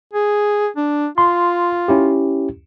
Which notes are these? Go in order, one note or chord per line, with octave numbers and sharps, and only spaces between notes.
G#4
D4
F4 C6
C#4 E4 G4